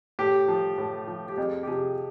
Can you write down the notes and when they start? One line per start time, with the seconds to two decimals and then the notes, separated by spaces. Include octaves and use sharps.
0.19 A2 G4
0.48 F3
0.78 A2
1.07 F3
1.29 G4
1.37 F2 G#4
1.63 G4
1.67 C3 F3 G#4